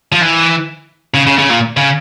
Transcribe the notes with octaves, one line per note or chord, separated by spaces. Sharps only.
F3
E3
C#3
C#3
C#3
A#2
C#3